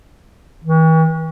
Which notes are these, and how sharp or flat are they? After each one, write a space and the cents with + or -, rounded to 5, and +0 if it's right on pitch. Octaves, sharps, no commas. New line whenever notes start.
E3 -45